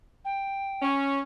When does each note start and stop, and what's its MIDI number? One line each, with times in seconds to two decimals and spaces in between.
0.25 0.88 79
0.82 1.21 61